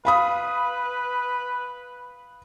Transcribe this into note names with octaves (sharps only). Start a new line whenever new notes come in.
B4 F5 B5 D#6